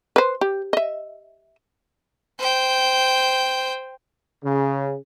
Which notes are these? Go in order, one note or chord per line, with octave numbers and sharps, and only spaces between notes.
B4 C5
G4
D#5 E5
C5 G5
C#3